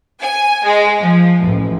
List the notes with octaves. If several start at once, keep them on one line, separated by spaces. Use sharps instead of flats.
G#5
G#3
F3
A1